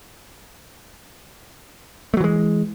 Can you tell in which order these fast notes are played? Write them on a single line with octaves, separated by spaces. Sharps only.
A3 F#3 E3 G#3